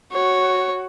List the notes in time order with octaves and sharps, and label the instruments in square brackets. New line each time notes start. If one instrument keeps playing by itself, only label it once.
[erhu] F#4 [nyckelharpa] C#5